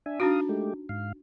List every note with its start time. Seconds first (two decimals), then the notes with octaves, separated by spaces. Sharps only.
0.06 D4 E5 G#5
0.20 D4 D#4 F#4 F5 D#6
0.49 G#3 A3 G4
0.89 G#2 F5